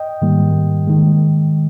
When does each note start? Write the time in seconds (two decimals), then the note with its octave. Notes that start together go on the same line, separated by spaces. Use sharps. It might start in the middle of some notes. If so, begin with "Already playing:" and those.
Already playing: D#5 G5
0.22 G#2 D#3 G3 A#3
0.87 D#3 G#3